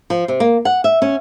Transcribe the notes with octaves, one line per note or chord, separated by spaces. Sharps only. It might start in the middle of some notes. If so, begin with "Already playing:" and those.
F3
C3
A#3
F#5
E5
C#4